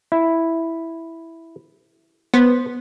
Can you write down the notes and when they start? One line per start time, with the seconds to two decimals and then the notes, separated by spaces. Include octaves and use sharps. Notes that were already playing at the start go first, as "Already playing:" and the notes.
0.12 E4
2.34 B3 C5